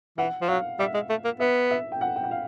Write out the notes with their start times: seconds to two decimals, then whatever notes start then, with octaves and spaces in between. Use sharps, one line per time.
0.18 E3 F#5
0.41 F3
0.49 F#3 F5
0.79 G3 E5
0.94 G#3
1.10 A3
1.24 A#3
1.40 B3 E5
1.71 E5
1.92 G5
2.01 F#5
2.16 G5
2.24 F#5
2.31 F5